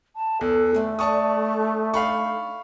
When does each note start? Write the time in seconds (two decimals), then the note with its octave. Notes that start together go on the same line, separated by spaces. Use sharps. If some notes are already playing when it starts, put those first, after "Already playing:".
0.15 A5
0.41 E2 A4
0.74 D3 A3 C4
0.99 D4 D5 D#5 A5 C#6 D#6
1.94 D4 D#4 F5 B5 C#6